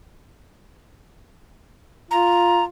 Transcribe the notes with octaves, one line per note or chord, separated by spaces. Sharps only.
F4 A#5